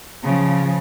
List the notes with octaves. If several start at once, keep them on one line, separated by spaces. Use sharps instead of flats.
C#3 F3